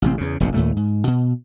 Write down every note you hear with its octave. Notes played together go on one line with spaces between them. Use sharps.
A1 C3 C4
E2 C#3
F1 A#1 G2 C3
D#2 A#2 A3
G#2
B2